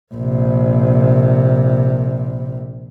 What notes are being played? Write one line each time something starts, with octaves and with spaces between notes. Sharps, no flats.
A#1 C3